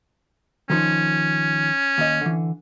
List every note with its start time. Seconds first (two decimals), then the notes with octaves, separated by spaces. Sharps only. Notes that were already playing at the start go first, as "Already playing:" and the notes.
0.70 D#3 F3 C#4 D#4
1.98 D#2 D#5
2.21 D3 E3